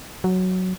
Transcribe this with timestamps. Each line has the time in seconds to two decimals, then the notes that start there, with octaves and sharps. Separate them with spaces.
0.24 F#3